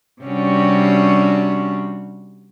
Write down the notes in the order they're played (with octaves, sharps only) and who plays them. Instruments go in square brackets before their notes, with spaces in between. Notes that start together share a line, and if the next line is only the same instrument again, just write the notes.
[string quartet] C3 G3 C#4 D4 F#4